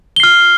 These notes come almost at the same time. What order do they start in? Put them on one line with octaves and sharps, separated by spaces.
G7 C7 F6